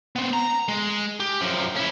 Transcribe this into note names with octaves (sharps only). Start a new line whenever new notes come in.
B3 C4
A#5
G#3
G4
F#2 F3
C#4 E4